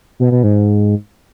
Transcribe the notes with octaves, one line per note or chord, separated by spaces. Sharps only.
B2
B2
G#2